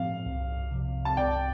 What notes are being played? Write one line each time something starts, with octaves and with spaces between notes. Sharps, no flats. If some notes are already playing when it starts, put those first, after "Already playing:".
Already playing: A2 F3 C4 F5
C2
C3 F3
A5
C2 D5 G5